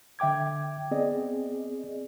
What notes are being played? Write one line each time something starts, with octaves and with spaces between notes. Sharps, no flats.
D3 E5 G5 D6 G#6
B3 C4 G#4 D5 D#5